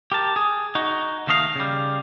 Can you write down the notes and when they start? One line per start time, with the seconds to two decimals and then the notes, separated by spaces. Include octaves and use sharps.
0.12 G4 A#4 A5
0.36 G#4
0.75 D#4 F#4
1.27 D#2 D#3 A3 D#5 F5
1.56 C#3 G3